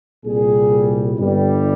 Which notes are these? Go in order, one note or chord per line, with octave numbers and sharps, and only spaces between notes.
C2 A#2 G3 G#4
G1 G2 G3